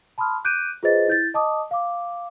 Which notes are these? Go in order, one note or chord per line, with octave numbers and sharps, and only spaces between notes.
A5 B5 C6 D#6 F6
D6 F#6 G6 D7 D#7
F4 G#4 B4 C5 D#5 A6
E4 G6 A6
D#5 A5 D6 D#6
F5 D6